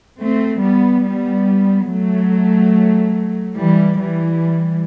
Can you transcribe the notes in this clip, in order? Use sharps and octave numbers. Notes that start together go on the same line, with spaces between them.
A3 C4
G3 B3
G3 B3
F#3 A3
E3 G3
E3 G3